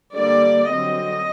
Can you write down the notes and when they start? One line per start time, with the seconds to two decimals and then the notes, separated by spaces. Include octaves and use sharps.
0.15 D3 G3 A#3 D5
0.69 D3 F#3 C4 D#5